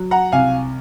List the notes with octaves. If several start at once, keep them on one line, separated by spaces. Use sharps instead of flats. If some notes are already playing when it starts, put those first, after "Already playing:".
Already playing: F#3
F#5 A#5
C2 F5 G#5